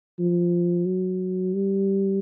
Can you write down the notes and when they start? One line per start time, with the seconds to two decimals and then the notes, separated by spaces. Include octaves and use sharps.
0.19 F3
0.86 F#3
1.54 G3